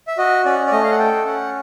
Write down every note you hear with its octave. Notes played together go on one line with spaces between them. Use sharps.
E5
F#4 D#5
C#4 D5
D5
A3 D#5
F5
F#5
A4 G5
C#4 F#5